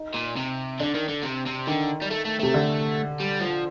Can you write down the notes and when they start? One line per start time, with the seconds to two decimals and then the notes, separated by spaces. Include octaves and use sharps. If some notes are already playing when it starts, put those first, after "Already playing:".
Already playing: D#4
0.14 A#2
0.37 C3
0.80 D3 D4
0.94 D#3
1.09 D3
1.23 C3
1.46 C3
1.67 D3 D#3
2.02 G3
2.11 A3
2.25 A3
2.40 C3 A3
2.54 D3
3.20 G3
3.40 F3